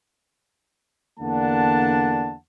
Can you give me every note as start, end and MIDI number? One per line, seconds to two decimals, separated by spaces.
1.19 2.35 40
1.19 2.35 50
1.19 2.35 58
1.19 2.35 62
1.19 2.35 78
1.19 2.35 81